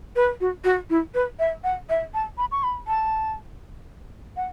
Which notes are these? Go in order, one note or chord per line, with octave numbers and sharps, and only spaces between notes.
B4
F#4
F#4
E4
B4
E5
F#5
E5
A5
B5
C#6
B5
A5
F#5